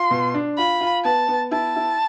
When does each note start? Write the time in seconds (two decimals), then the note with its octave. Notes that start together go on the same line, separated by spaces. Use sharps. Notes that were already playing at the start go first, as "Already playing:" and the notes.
Already playing: F4 C6
0.11 B2
0.34 D4
0.58 F4 B5
0.81 F4
1.04 B3 A5
1.28 B3
1.51 E4 A5
1.76 E4